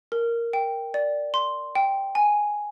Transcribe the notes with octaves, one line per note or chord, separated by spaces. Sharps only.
A#4
G5
D5
C6
G5
G#5